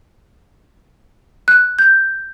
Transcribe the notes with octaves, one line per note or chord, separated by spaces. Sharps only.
F#6
G6